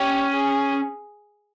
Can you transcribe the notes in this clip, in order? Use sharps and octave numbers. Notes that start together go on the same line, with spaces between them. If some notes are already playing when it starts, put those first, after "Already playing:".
Already playing: C#4 G4
G#4